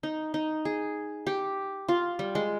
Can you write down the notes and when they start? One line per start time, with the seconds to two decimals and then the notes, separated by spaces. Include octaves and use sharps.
0.03 D#4
0.34 D#4
0.65 G#4
1.27 G4
1.89 F4
2.19 G3
2.35 G#3